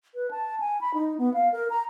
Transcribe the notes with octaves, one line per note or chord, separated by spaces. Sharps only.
B4
A5
G#5
B5
D#4
B3
F5
A#4
A#5